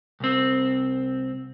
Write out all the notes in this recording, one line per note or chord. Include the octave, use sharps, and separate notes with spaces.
C2 C4